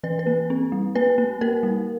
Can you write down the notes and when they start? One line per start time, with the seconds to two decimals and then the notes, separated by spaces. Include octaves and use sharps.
0.03 E3 B4
0.19 B4
0.27 A#3
0.50 C4
0.72 G3
0.95 A#3 B4
1.18 A#3
1.41 A#3 A#4
1.63 G3